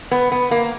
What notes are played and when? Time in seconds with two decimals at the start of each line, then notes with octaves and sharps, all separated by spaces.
0.11 B3
0.32 B3
0.51 A#3